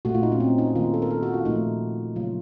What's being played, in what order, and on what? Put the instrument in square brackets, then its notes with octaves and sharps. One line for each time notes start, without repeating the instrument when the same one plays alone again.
[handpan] A#2 A3 F#4
F4
D#4
C#4
C4
D#4
D#3 A#3 F4
A4
A#4
A4
F#4
F4
A#2 F3 A3 D#4
C#3 F#3 A#3 F4